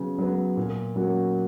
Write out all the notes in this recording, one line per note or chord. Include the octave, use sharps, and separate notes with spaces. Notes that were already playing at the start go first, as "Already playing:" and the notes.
Already playing: C#3 F#3 B3
F#3 B3
A#2
F#3 A#3 C#4 F#4